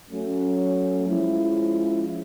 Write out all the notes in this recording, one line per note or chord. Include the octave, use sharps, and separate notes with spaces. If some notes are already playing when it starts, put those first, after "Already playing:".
F#3 A3 C#4
F3 G#3 C#4 E4